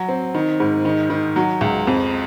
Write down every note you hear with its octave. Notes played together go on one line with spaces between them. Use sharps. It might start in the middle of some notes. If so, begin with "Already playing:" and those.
Already playing: F#3
C4
D#3
G#2
D#3
D#3
F#3
C#2
F2